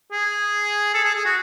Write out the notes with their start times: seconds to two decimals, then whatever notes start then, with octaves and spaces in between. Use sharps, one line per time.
0.12 G#4
0.94 A4
1.05 G#4
1.15 G#4
1.25 F#4